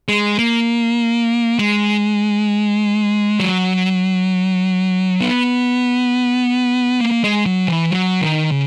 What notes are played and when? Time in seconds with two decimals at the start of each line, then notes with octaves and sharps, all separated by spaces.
0.08 G#3
0.39 A#3
1.59 G#3
3.40 F#3
5.21 B3
7.00 A#3
7.24 G#3
7.46 F#3
7.68 E3
7.91 F#3
8.21 D#3
8.51 C#3